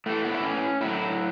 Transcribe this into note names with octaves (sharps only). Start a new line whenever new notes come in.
A2 E3 A3
B3
E4
C#4
A2 F#3 E4